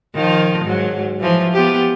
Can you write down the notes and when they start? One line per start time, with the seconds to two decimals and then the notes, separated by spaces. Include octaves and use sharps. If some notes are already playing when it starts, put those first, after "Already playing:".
0.15 D#3 F3 F4
0.64 G#2 F#3
1.20 E3 F3
1.53 B3 F4 G4